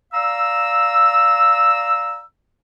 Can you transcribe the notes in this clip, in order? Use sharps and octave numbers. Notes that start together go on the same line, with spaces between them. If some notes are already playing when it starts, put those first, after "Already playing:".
D5 F5 A#5 E6